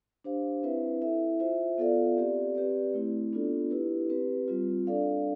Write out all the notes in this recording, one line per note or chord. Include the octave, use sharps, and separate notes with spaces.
D4 G4 C5 F5
C4 E4 B4 E5
E4 A4 E5
F4 C5 E5
B3 F4 A4 D5 F5
C4 G4 D5
C4 G4 B4 D5
A3 C4 E4
B3 D4 F4 A4 D5
E4 G4 B4
C4 G4 B4
G3 C4 F4
D4 A4 D5 F5